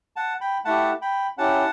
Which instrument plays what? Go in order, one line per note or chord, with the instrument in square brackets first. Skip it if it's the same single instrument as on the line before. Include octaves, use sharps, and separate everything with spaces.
[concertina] F#5 A5
G5 B5
A3 E4 G4 F#5 A5
G5 B5
C#4 E4 G4 F#5 A5